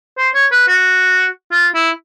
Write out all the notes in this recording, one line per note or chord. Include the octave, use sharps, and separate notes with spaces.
C5
C#5
B4
F#4
F4
E4